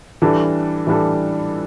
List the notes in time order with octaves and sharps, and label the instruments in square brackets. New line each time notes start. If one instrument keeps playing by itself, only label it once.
[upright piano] E3 G3 D4 A4
E3 G3 D4 A4